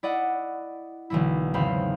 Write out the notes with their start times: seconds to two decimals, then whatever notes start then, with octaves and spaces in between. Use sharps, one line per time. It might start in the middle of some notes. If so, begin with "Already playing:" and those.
0.03 E4 D5 D#5 F#5
1.10 B1 D3 E3 A#3 E4
1.54 G#1 E2 C#3 C4 F5 B5